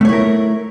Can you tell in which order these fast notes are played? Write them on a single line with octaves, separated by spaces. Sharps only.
A3 C#5 E4 A#4